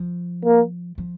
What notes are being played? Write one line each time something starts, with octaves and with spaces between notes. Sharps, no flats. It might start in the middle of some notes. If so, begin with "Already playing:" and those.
Already playing: F3
A#3
F3